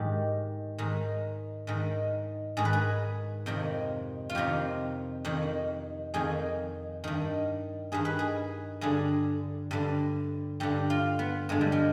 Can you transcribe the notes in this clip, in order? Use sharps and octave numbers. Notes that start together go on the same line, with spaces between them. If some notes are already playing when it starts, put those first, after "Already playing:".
Already playing: G#2 D#3 G4
G#2 D#3
G#2 D#3
G#2 D#3 G#4
B4
G#4
F2 C3 D#3
F4
F2 C3 D#3 G4
F2 D#3
F2 D#3 G#4
G2 D#3
G2 D#3 G#4
B4
G#4
G2 D3 G#4
G2 D3
G2 D3 G4
F4
B3
G2 D3 G#3
G3
F3